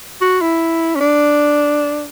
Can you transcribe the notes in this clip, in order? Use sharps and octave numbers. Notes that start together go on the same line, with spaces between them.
F#4
E4
C#4
D4